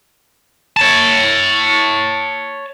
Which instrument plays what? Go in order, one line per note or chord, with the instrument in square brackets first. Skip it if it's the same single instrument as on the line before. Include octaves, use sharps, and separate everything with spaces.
[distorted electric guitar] C#5 A5